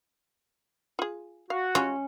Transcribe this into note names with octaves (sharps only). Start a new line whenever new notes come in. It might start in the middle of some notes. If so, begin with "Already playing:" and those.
F4 G#4
F#4 F5
G3 C#4 F4